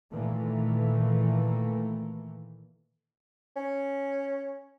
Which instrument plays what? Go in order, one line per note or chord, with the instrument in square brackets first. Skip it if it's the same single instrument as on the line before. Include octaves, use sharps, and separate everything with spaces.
[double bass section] A#2 D#3 E3 A3 A#3
[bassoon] C#4